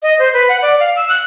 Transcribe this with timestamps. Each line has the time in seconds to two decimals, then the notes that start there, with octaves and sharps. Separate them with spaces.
0.03 D#5
0.19 C5
0.34 B4
0.49 F#5
0.62 D5
0.80 F5
0.96 E6
1.09 F#6